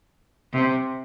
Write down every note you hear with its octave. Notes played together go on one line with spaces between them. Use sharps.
C3